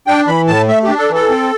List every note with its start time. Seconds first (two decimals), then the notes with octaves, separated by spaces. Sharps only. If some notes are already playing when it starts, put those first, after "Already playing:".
0.07 D4 G5
0.27 E3 B5
0.47 A2 A5
0.68 A3 E5
0.83 G4
0.88 D4
0.99 A4
1.09 E3
1.15 A4
1.29 C4